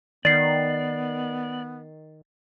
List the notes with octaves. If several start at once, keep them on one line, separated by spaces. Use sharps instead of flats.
D#3 B3 D5 A6 C7